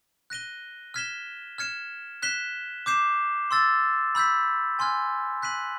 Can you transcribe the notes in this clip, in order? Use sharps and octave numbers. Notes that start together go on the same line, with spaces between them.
F#6 A#6 D#7 G7
F6 G#6 B6 E7 G7
F6 G#6 C#7 E7
F#6 B6 E7 G7
D6 G6 C7 E7
C6 E6 A6
B5 E6 G6 B6
G#5 C6 F6 G#6
F#6 B6 D#7 F#7